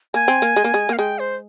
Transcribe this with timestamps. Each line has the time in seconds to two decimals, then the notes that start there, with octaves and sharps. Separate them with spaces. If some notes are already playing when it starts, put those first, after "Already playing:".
0.14 A#3 G#5
0.28 C4
0.42 A#3
0.56 G#3
0.64 A#3
0.74 G#3
0.89 A#3 F5
0.98 G#3 G5
1.19 C5